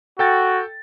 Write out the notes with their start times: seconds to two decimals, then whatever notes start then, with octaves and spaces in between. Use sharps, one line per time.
0.19 F#4 A4 G5 A6